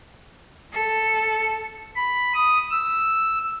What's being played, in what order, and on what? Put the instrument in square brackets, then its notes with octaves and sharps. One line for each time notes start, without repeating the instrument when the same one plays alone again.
[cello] A4
[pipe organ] B5
D#6
E6